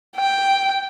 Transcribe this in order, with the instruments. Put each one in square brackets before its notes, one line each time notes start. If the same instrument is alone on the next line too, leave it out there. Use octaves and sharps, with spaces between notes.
[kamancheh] G5